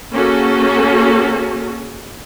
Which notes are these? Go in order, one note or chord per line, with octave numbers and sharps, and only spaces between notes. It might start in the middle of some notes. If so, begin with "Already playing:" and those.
A#3 C#4 F#4 G#4 A4